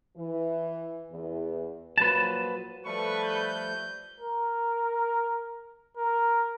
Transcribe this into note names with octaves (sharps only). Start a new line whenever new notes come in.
E3
E2
A#2 F3 F#3 B4 A5
F3 G3 A3 A4 B4 C#6
G6
A#4
A#4